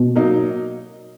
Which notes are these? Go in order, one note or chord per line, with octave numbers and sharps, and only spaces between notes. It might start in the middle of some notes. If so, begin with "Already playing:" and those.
Already playing: B2
F#3 A#3 D#4